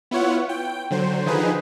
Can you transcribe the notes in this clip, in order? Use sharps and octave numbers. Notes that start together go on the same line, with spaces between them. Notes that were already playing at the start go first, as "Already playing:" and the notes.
B3 E4 F4 C#5 F#5
G5
D3 F#3 C5
D3 D#3 F3 D#4 G#4 B4